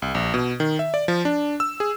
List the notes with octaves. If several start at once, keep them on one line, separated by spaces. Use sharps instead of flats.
C2
A#1
B2
D#3
E5
D5
F3
D4
E6
G#4